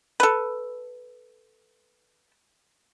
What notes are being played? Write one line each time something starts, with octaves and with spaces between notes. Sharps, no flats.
A4 B4